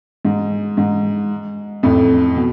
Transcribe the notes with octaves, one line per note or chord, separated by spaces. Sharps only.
G#2
G#2
F2 A2
B2